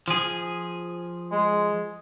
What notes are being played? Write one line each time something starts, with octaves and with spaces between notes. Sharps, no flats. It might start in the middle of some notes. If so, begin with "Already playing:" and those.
F3 G#4
G#3